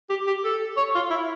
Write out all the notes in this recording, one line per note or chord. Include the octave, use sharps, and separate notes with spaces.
G4
G4
A4
C#5
F4
E4